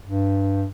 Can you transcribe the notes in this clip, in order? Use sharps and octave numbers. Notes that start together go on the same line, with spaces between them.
G2